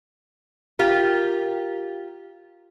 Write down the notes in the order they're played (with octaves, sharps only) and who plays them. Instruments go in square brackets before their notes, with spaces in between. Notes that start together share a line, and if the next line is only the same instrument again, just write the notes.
[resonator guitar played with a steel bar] F4 G4 A#4